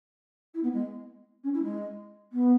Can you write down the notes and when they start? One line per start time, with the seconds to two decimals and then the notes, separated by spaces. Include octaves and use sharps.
0.54 E4
0.63 B3
0.73 G#3
1.43 C#4
1.53 E4
1.63 G#3
2.32 B3